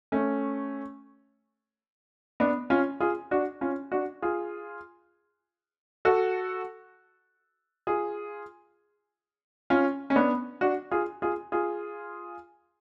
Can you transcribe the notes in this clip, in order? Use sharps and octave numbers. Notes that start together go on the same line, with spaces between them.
A3 C#4
B3 D4
C#4 F4
F4 G#4
D4 F#4
C#4 F4
D4 F#4
F4 G#4
F#4 A4
F4 G#4
C#4 F4
C#4
B3 D4
D4 F#4
F4 G#4
F4 G#4
F4 G#4